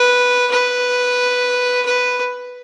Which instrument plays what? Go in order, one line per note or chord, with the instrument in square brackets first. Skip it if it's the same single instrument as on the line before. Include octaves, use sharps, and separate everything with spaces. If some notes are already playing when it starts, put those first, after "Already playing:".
Already playing: [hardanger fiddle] B4
B4
B4